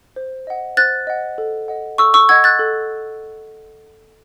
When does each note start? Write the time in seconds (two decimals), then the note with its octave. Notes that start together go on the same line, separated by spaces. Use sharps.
0.16 C5
0.47 D#5 F#5
0.77 C5 F#6 A6
1.07 D#5 F#5
1.38 A4
1.68 D#5 F#5
1.98 A4 C#6 E6
2.14 C#6 E6
2.29 D#5 F#5 E6 G#6
2.44 F#6 A6
2.59 A4